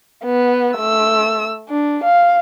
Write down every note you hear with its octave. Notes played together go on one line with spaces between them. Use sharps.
B3
A3 E6
D4
F5